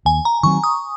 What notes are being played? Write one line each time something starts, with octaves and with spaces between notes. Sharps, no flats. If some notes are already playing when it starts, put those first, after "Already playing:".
D#2 G#5
A#5
D#3 F#3 C4 C#6
D#6